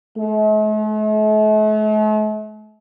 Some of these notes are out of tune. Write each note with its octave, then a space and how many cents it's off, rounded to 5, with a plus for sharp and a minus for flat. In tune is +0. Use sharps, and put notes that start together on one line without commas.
A3 -45